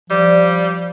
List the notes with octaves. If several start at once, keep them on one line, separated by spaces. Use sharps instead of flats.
F3 G3 D5